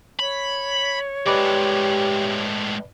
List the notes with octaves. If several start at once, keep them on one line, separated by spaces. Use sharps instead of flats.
C#5 B5
A2 G#3 G4 B4 D5 D6